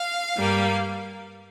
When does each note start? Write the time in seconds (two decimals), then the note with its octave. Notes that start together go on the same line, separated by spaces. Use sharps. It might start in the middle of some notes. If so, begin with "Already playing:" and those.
Already playing: F5
0.38 G2 G3 A#3